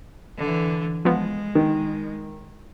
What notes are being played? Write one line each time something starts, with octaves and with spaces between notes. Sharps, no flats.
D3 E3
F3 G#3 B3
D#3